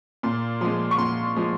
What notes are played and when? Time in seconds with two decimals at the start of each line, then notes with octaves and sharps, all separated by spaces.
0.23 A#2 C6
0.61 F3 G#3 C6
0.91 C#6
0.98 A#2 C6
1.36 F3 G#3